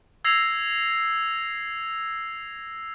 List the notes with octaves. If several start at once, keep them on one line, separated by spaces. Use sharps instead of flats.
E6 G#6 A#6 C7 F7